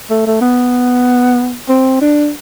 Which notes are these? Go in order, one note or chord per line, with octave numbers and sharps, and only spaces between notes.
A3
A3
B3
C4
D4